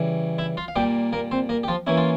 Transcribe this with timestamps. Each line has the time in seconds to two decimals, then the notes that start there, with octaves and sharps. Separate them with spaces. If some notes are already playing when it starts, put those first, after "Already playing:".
Already playing: C#3 E3 G3
0.38 E4 E5
0.57 F4 F5
0.68 F5
0.76 A#2 G3 A#3 G4 G5
1.13 A#3 A#4
1.31 C4 C5
1.49 A#3 A#4
1.63 G4
1.68 F3 F4
1.87 E3 A#3 C#4 E4
1.97 F4